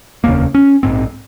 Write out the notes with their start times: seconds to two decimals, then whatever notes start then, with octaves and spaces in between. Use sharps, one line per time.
0.24 F1 D#2 C#3 A#3
0.54 C#4
0.83 A#1 G#2 C4